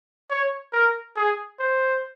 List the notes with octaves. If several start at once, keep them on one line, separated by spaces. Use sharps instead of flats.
C#5
A#4
G#4
C5